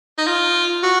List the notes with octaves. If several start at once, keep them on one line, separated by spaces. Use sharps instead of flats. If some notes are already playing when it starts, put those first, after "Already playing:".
D#4
F4
F#4